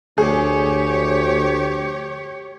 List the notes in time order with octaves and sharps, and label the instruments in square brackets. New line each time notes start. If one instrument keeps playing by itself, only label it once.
[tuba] D2 [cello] G4 C#5 [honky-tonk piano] G#4